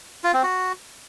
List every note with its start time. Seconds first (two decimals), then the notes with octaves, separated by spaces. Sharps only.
0.24 F4
0.34 C4
0.43 F#4